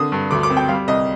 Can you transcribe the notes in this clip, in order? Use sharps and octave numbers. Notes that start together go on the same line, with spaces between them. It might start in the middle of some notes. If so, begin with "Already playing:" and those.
Already playing: D3 C4 D#6
G2
D2 D6
D6
C4
G5
G3 F5
C2 D#5